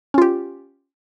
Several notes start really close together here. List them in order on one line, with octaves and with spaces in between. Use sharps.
C#4 F4 G4